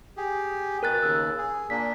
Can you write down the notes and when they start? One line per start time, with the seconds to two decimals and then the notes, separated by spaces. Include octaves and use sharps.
0.17 G4 G#4
0.83 B2 A#4 F#6 A6
1.02 D#2 C#3 E6
1.38 G#4
1.70 A#2 A#3 D4 B6